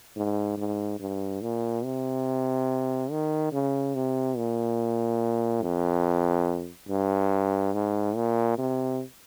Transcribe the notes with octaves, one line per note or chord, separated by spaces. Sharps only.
G#2
G#2
G2
A#2
C3
D#3
C#3
C3
A#2
F2
G2
G#2
A#2
C3